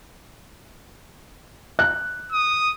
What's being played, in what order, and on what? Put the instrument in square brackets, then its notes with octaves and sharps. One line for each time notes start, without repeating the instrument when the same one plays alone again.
[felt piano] F#6
[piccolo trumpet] D#6